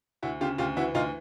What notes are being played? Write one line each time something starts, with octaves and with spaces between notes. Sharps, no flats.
D2 E4 F#4
C#3 F4 G4
D2 F4 G4
E3 E4 F#4
D2 D#4 F4